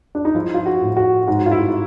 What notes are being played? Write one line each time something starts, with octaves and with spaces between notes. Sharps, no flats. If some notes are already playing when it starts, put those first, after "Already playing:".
D4
D#4
F3 E4
F4
F#4
A2
F#4
G#2 F#4
F4
E4